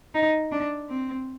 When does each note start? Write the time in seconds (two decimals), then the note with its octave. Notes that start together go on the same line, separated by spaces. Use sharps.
0.14 D#4
0.52 D4
0.89 C4